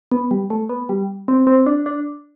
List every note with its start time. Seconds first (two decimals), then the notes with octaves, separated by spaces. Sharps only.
0.12 B3
0.31 G3
0.50 A3
0.69 B3
0.89 G3
1.28 C4
1.47 C4
1.66 D4
1.86 D4